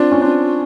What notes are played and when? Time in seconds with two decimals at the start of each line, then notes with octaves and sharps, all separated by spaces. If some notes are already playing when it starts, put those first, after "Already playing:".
Already playing: C4 D4 F4
0.12 C#4
0.22 C4 D4